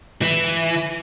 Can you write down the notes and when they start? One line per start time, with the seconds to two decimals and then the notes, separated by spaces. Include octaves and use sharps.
0.22 E3